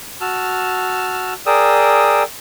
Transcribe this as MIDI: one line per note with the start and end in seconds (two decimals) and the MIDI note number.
0.21 1.33 66
0.21 1.33 81
0.21 1.33 88
0.21 1.33 89
1.46 2.23 68
1.46 2.23 70
1.46 2.23 74
1.46 2.23 79
1.46 2.23 87
1.46 2.23 88